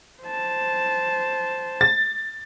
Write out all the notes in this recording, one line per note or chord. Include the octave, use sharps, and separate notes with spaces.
C5 A5
A6